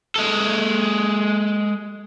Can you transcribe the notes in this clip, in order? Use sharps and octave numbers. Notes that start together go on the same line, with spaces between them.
G#3 A4